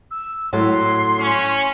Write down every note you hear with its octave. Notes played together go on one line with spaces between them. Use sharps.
E6
A2 F#3 A4 C6
C#4